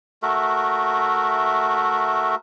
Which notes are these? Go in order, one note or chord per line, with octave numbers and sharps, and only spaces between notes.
A3 F#4 A#4 E5